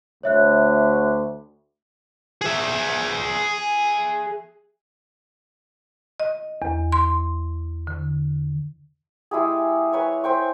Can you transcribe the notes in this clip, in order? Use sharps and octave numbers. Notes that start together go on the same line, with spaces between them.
D2 C#5 E5 F#6
G#4 E5
D#5
E2
C6
D3
G#3 E4 G4 G#4
B4 C#5 G#5
C5 G5 C#6